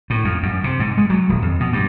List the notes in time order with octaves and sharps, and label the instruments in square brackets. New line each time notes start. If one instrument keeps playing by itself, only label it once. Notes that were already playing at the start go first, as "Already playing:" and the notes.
[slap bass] A2
F2
F#2
C3
G#2
G#3
F#3
D#1
F2
B2
G2